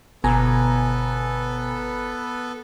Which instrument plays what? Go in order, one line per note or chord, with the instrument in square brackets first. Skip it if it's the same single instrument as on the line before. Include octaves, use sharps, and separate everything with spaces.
[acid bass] G1 [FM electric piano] B2 G#5 A#5 [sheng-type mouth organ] B3 A4 B4